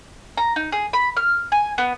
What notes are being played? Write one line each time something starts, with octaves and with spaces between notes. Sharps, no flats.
A#5
D#4
G#4
B5
F6
G#5
B3